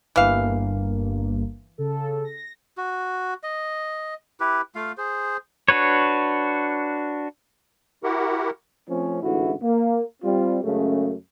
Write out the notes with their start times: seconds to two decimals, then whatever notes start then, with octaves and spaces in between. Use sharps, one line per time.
0.16 G1 G2 E3 A#3 F5
1.78 C#3 A4
2.25 A#6
2.78 F#4
3.43 D#5
4.40 E4 G4 B4
4.75 A3 F4 F5
4.98 G#4 C5
5.68 D4 F#4 B4 C#5
8.04 E4 F#4 G4 A#4 F#5
8.89 F3 A3 C4 C#4
9.23 A1 D2 G#2 A3 E4 F#4
9.62 A#3
10.22 G3 C4 F4
10.64 F#2 C#3 G#3 A3